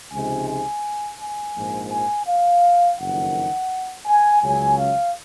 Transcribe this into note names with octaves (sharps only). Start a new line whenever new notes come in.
C#2 C3 F3 G#3 D#4 G#5
G#5
G#5
A#1 G#2 F3 A#3
G#5
F5
F#1 F2 D#3 F#5
G#5
C#2 C#3 F#3 G#5
F5